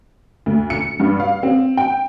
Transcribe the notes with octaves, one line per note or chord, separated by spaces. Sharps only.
D2
C#7
G2
F5
C4
G5